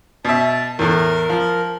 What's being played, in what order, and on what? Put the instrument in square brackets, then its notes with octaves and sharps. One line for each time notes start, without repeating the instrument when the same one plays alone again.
[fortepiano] B2 E5 [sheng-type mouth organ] A5
[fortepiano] E2 A2 [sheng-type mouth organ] A#4
[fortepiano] F3